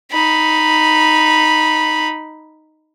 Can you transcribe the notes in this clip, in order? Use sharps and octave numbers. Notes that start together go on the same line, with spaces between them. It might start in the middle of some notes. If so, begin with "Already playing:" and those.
D#4 B5